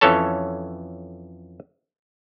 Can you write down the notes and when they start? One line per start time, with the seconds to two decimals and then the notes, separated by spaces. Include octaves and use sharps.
0.01 F2 E3 C#4 A4 C#5 A5